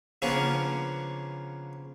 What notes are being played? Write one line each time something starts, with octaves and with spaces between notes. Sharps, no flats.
C#3 F3 A#3 B3 C#4 D4